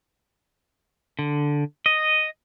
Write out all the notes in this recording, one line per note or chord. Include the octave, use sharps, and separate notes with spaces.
D3
D#5